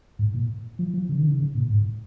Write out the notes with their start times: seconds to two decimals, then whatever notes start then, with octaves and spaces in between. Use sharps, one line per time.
0.19 G#2
0.34 A#2
0.79 F3
0.94 F3
1.09 C#3
1.18 D#3
1.27 C#3
1.39 C#3
1.55 A#2
1.70 G#2